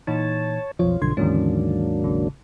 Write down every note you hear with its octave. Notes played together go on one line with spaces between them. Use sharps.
A#2 E3 D#4 C#5 A5
B1 F2 F3 F4 C#5
B1 G2 D3 F3 C6 G#6
D#2 G#2 D3 E3 F#3 A#3 C#4 D4
G#1 C#3